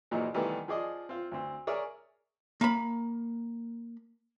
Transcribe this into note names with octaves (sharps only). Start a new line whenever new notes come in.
A#1 A#2 E3 F#3 D#4 A#4
C3 D#3 E3 G3 A3 B3
F3 G#4 D5 D#5
C4 F4
D2 C4
G#4 A#4 C#5 D5 E5
A#3 B5